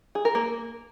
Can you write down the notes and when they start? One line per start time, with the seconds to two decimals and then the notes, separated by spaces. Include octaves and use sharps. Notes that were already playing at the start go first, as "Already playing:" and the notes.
0.15 G#4
0.25 A#4
0.35 A#3